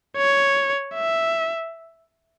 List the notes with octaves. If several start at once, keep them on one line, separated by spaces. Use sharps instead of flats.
C#5
E5